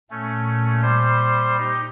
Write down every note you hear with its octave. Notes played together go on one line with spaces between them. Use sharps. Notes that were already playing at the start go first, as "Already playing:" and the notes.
A#2 A3 C#4
G3 C5
D#4 G4